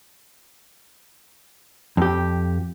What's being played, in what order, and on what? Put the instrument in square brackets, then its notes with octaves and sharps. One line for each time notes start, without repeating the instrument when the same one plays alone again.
[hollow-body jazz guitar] F2 G4